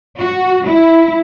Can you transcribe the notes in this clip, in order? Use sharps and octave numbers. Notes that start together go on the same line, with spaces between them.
F#4
E4